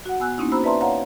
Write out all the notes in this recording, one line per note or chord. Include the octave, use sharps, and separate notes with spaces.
F#4 F#5
B3 G#5 E6 F#6
A#3 C4 C#4 D#4 E4
F#4 C5 A#5 B5 E6
B4 D5 E5 A5 A#5 C6
C#5 F5 F#5 A#5